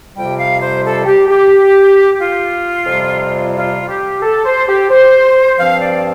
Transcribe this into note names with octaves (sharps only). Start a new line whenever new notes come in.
F2 C3 G3 G5
F5
C5
A4
G4
G4
F4
F2 C3 G3
F4
G4
A4
C5
G4
C5
G2 F3 C4 F5
D5